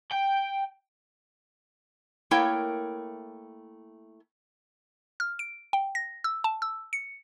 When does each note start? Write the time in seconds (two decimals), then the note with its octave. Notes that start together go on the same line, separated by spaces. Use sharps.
0.12 G5
2.31 A3 A#3 E4 A#4 C#5 G5
5.20 F6
5.39 D7
5.73 G5
5.95 A#6
6.24 E6
6.44 A5
6.62 E6
6.93 C#7